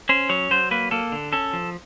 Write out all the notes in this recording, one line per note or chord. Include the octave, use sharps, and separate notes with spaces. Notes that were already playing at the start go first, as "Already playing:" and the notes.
C#4 C5
F#3 C#5
F#3 C5
A#3 B4
A#3 A4
D3
C#4 A4
F3